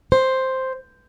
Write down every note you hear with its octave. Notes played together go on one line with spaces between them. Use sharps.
C5